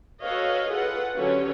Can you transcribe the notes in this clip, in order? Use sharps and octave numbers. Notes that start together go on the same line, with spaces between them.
F#4 A4 B4 C#5 D#5 F5
F4 G#4 A4 B4 F#5
D3 F#3 C#4 G4 B4 C#5